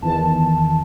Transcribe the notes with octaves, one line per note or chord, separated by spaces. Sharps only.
E2 D#3 E3 A5